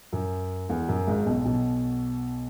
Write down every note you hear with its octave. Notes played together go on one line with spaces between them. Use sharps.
F#2
E2
F#2
G#1 G#2
B1 B2
B1 B2